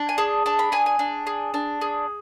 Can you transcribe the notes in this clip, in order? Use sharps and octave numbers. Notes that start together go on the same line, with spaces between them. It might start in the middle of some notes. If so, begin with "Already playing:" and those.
Already playing: D4
G#5
G#4 A5
D4 A5
B5
G#4 G#5
G#5
D4
G#4
D4
G#4